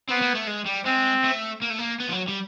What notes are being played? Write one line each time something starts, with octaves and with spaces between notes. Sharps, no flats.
B3 C4
A#3
A3
G#3
G3
G#3 C4
A3
A#3
A3
A#3
B3
F3
F#3
G3